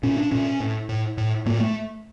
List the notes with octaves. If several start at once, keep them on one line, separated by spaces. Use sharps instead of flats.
A#2 C#4
D4
A#2 C#4
A2
A2
A2
A2 A#3
A3